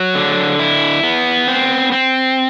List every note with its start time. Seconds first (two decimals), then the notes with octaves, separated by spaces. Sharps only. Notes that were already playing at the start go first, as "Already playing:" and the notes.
Already playing: F#3
0.15 D3
0.59 E4
1.03 B3
1.48 C4
1.92 C4